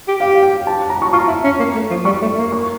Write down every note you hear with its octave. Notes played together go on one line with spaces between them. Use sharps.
G4
G4 F5
G5
A5
A#5
C#6
F4 C#6
E4
C#4
A#3
A3
F3
G3 C#6
A3
A#3
C#6